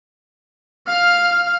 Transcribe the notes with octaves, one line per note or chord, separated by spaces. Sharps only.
F5 F6